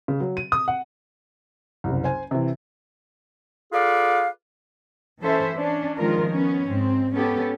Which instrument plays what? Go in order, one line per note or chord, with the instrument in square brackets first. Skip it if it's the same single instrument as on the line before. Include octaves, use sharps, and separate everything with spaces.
[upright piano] C#3
F#3
D#7
D#6
F#5
[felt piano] F#1 C2
C5 G#5
C3 E3
[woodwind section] F4 G#4 A4 B4 D5 F5
[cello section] E3 C#4 A4 C5 E5
C#4 D4
D#3 F3 G#3 F4 A#4
B3 C#4
G#2 C4
B3 C#4 G4 A4